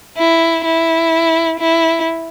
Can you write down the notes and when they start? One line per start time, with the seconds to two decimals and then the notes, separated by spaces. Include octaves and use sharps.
0.18 E4
0.65 E4
1.60 E4